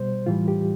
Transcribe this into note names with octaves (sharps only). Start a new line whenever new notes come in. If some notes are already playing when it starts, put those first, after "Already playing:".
Already playing: B2 G3 C5
A2 E3 G3 F4
G4